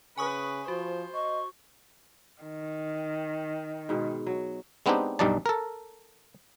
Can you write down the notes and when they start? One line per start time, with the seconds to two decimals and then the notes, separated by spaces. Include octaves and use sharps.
0.18 C#3 B4 G#5 C#6 D#6
0.68 F3 F#4 C5
1.14 D#5 C#6
2.43 D#3
3.89 G#2 B2
4.27 F#3
4.86 G#3 B3 C4 D4 D#4 G4
5.19 B1 G2 G3 D#4 D5 A5
5.46 A4 A#4